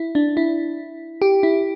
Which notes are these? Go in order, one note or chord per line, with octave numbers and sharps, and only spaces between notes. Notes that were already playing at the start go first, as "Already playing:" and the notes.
Already playing: E4
D4
E4
G4
E4